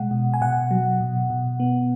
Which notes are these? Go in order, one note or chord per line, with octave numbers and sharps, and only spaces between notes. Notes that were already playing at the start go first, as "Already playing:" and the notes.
Already playing: B2 G#3 F#5
B2
G#5
B2 F#5
F#3
B2
B2
B3